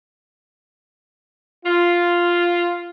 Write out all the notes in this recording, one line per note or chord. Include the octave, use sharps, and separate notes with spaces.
F4